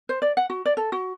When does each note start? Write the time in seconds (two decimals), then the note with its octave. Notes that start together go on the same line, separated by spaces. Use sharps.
0.09 C5
0.22 D5
0.37 F#5
0.50 F#4
0.65 D5
0.77 A4
0.92 F#4